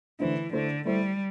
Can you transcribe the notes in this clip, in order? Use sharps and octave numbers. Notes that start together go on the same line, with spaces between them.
D3 E3 A3 E4 C5
D3 A3 E4 C5
G3 A3 E4 C5